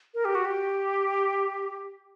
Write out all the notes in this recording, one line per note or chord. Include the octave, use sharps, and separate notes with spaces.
A#4
G4
F#4
G4